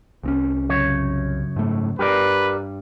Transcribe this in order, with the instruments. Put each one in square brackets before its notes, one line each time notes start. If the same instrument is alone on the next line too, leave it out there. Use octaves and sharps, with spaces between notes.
[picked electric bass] C2 C4 C#4
[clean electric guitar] F#2 C#3 C#5
[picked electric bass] G#2 A3
[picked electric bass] G2 [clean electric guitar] G4 A#4 D5 [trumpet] B4